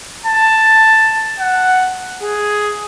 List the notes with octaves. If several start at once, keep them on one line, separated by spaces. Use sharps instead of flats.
A5
F#5
G#4